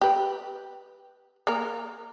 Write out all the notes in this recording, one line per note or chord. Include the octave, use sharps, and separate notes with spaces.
G4 B4
A#3 A#4